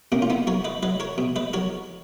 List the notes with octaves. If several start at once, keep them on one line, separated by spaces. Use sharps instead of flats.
B2 A#3 C#4
F4
B3 D#4
F#3 A#4 C#5
B4 D#5
F#3 B4 D#5
A#4 C#5
B2
B4 D#5
F#3 A#4 C#5